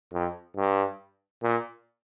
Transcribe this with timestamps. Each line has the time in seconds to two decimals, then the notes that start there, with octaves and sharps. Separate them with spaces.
0.13 F2
0.57 G2
1.43 A#2